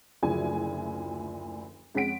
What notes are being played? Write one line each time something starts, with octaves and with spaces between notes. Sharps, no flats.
F#1 D2 F3 E4 D5 G#5
F2 G#3 C#4 F#5 B6 D7